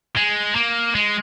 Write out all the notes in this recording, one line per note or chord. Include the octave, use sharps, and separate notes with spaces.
G#3
A#3
G#3